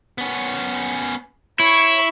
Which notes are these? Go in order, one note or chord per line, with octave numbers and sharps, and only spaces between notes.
B3 C#4
E4 C#5 B5 C#6